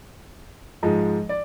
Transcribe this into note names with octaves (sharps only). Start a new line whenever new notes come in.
G#2 F3 G#3 D#5
D5